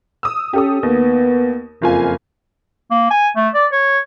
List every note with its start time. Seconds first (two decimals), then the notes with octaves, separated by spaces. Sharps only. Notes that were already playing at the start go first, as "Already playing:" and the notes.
0.23 D#6 E6
0.53 C#4 G4 A4 D#6
0.83 D#2 B3
1.82 F#1 F2 F4 G#5
2.91 A#3
3.11 G#5
3.36 A3
3.54 D5
3.72 C#5